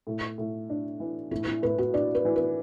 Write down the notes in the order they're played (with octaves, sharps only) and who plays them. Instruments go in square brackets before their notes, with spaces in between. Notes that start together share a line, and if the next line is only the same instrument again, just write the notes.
[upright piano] A2
A2
D4
E3
[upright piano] A2 [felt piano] E4
[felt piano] E4
[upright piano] A2 [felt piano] B4
[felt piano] F#4
[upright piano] D4 [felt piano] D5
[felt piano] B4
[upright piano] E3
[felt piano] B4